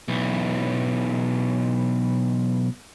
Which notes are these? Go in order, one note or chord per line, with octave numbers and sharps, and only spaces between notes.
B1 E3